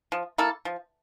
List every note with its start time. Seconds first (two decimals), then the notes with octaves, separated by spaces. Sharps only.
0.12 F3
0.38 A#3 E4 A4
0.65 F3